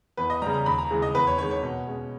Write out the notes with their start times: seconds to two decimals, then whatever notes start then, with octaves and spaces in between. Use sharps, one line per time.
0.17 E2 B4
0.30 D#5
0.42 C#3 G3 A#5
0.54 A#5
0.66 D#2 B5
0.78 A#5
0.90 C#3 E3 G#3 C#4
1.02 D#5
1.15 E2 B4
1.27 C#5
1.38 D#3 G#3 C#5
1.51 C#5
1.63 B2
1.87 G#3 C#4